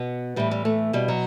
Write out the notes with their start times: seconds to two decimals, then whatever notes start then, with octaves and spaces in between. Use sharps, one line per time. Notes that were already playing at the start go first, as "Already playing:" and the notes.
Already playing: B2 B3
0.36 A2 E3 G3
0.51 G3
0.65 A3
0.93 B2 G3
1.08 F#3